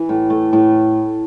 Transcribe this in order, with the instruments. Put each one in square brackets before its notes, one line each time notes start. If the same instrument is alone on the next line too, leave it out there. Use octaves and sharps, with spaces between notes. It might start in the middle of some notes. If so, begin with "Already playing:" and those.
Already playing: [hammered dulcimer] E3
A2
A3
A2